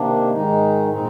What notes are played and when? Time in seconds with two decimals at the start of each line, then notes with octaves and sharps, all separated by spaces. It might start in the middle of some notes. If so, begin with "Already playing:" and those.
Already playing: C3 D#3 A#3 D4
0.31 G#2 D#3 G#3 D#4
0.89 A#2 G#3 C4 D#4